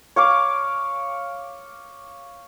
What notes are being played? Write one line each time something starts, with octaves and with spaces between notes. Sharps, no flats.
C#5 F5 D6